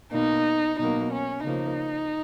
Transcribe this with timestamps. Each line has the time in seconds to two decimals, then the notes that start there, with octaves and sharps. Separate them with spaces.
0.12 B2 A#3 D#4
0.78 B2 F#3 A#3 D#4
1.12 C#4
1.45 C#3 F3 A#3 D#4